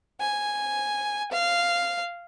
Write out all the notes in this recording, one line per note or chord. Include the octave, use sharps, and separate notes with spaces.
G#5
F5